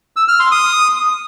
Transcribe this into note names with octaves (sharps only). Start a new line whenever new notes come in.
E6
F6
C6
D#6